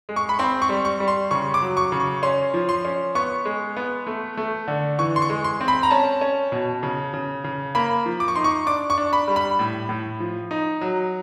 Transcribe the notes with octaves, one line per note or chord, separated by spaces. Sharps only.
G#3
C#6
B5
C4 C6
C#6
G3
C#6
G3
C6
C#3 C#6
D6
F#3
C#6
C#3
C#6
C#4 C6
F3
C6
C#4
B3 C#6
G#3
B3
A3
A3
D3
E3 C#6
C6
C#6
G#3
C6
C4
B5
A#5
C#4 A5
C#4
B2
C#3
C#3
C#3
A#3 B5
F3
D6
C#6
D#4 C6
C#6
D4 D6
C#6
D4
B5
G3
B5
A2
A2
F3
D#4
F#3